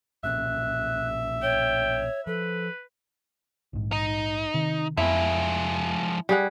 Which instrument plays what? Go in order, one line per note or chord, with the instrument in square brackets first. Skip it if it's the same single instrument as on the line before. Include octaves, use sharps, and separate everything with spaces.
[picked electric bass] B1 A#2 C#4 [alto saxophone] E5 [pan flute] F#6
[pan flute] C#5 [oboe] G5
[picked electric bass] F3 [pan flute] A4 [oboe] B4
[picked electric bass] A#1 G#2
[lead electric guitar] D#4
[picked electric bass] C3 D#3
[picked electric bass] F2 B3 [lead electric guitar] F3 G#3 [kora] E4
[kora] G3 G#4 F#5